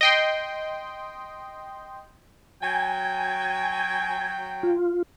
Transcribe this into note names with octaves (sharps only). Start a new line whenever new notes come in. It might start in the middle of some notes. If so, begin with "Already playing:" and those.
D#5 G5 C6
F#3 G5 G#5
F4